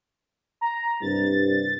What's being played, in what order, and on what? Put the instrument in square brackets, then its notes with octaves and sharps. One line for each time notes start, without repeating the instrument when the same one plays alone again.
[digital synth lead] A#5
[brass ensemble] C2 G2 [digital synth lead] A6